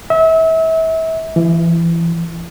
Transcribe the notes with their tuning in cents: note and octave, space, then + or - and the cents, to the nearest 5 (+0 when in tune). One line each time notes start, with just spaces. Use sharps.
E5 -35
E3 +30